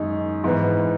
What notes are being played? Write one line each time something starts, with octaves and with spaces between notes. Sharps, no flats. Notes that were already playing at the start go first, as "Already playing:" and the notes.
Already playing: F#2 D#3 G#3 D#4
G#2 E3 B3